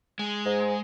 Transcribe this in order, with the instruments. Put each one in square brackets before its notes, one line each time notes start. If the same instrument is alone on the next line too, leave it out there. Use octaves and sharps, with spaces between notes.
[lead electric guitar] G#3
[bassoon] G#2